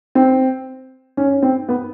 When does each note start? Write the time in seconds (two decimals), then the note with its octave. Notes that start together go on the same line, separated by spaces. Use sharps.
0.15 C4
1.17 C#4
1.42 C4
1.69 B3